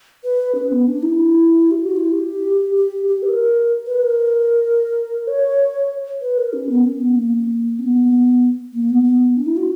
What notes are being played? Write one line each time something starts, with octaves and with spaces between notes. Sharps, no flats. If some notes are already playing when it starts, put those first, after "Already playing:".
B4
C#4
B3
D4
E4
G4
F#4
E4
G4
G4
G4
B4
A#4
B4
A#4
C#5
B4
A#4
C#4
B3
C#4
B3
A#3
C#4
B3
A#3
B3
B3
D4
E4
F#4